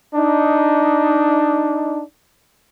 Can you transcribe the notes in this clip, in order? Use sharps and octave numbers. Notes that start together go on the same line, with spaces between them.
D4 D#4